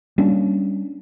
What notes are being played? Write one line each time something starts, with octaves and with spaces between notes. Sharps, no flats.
G3 A#3 C#4 D4